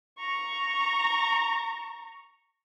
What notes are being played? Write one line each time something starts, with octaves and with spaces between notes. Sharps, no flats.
A#5 C#6